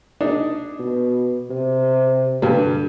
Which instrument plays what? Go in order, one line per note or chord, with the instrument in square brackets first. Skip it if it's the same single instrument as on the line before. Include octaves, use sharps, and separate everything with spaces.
[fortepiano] D4 D#4 G#4
[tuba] B2
C3
[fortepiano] G2 G3 [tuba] D3